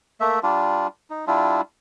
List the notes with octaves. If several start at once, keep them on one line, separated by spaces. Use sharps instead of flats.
A3 A#3 E5
G3 D4 F4
D#4
G3 D4 E4 F4